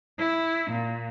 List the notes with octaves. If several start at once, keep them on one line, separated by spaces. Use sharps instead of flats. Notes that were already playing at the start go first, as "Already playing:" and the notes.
E4
A#2